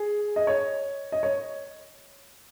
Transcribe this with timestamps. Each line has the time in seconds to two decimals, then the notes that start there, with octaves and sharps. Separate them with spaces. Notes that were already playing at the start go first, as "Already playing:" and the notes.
Already playing: G#4
0.36 D#5
0.47 C#5
1.12 D#5
1.23 C#5